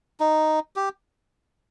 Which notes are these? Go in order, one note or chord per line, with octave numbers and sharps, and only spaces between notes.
D#4
G4